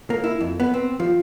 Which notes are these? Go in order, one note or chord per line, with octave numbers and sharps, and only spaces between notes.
A#3
E4
F2
B3
C4
F3